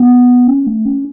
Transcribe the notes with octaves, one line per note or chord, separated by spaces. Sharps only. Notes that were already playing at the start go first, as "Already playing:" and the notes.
Already playing: B3
C#4
A3
C#4